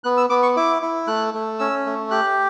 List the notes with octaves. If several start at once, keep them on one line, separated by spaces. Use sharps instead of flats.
B3 F#6
E6
B3 D6
C#6
E4 D6
E4
A3 F#6
A3
C#4 E6
A3
G4 F#6